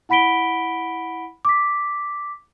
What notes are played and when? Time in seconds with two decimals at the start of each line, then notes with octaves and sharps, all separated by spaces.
0.09 E4 F#5 B5 B6 D7 G7
1.45 D6 B6